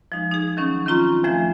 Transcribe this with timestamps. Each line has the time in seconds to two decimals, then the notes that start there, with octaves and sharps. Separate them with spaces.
0.12 F3 G#3 D#4
0.32 D#4 G#4
0.57 D#3 F#3 C#4 D#4
0.86 D#3 C4 C#4 F4 A#5 C6
1.24 E2 F3 A3 E5 G#6